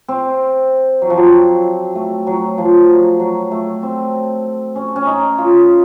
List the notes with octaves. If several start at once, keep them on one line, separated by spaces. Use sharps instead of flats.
C4
F#3
F3
F#3
A3
F#3
F3
F#3
F#3
A3
C4
C#4
C#4
D#4
F4